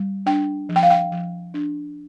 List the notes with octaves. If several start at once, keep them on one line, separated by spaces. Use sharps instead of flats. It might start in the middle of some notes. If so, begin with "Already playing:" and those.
Already playing: G3
D4 G5
F3
G5
F5
G5
F3
D4